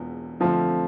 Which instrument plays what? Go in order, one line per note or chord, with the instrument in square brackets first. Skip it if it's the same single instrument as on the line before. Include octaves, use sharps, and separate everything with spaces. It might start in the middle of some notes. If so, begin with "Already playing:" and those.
Already playing: [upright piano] E1 E2 B2 B3 F4
[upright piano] F2 D3 A3 C4 [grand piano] F3